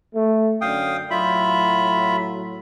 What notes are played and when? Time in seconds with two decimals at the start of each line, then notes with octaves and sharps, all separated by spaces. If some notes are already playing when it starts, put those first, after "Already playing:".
0.14 A3
0.61 F#2 D3 C#4 F5 G5 D#6
1.11 A2 F#3 F4 E5 B5